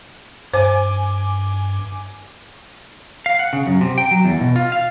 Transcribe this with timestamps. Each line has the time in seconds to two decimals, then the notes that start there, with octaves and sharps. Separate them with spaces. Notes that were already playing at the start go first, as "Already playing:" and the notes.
0.54 G2 C5 G#5 D6
3.26 F5
3.39 F#5
3.53 C#3
3.67 F#2
3.81 C3
3.98 G5
4.11 F#3
4.24 E2
4.41 B2
4.56 F4
4.72 F5